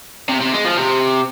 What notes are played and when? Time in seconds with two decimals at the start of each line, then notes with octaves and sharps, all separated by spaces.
0.29 C3
0.40 C3
0.53 G#3
0.65 F3
0.77 C3